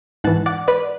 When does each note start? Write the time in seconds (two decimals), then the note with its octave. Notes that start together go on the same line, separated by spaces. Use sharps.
0.24 G#2 E3 F#5 A5
0.46 D5 F#5
0.68 B4 D5